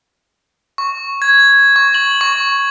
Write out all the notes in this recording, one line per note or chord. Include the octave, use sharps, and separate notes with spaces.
C#6
G#6
C#6
F#7
C#6